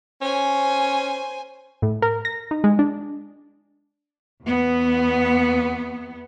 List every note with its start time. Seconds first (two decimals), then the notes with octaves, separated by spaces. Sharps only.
0.22 C#4 C5 G#5
1.82 A2
2.02 A#4
2.25 A#6
2.51 D#4
2.64 G#3
2.79 D4
4.43 E2 B3